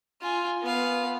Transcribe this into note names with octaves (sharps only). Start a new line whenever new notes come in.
F4 G#5
B3 F5